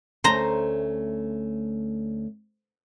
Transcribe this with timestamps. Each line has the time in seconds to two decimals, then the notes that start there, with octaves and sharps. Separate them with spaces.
0.24 D2 A3 C#4 C5 A#5